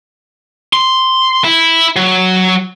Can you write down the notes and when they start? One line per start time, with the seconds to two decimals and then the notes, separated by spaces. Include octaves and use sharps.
0.73 C6
1.44 E4
1.96 F#3